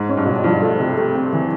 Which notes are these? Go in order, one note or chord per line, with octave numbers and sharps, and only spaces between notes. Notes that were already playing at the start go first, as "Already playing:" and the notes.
Already playing: G#2
C#4
G2
B2
G2 F3
A3
C3
A3
C4
E3